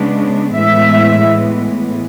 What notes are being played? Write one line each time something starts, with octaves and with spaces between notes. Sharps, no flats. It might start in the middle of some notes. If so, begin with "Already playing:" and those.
Already playing: C#3 G#3 B3 D4
A2 E3 G#3 B3 E5